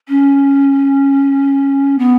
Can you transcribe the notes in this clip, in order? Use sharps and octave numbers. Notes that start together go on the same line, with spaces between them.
C#4
B3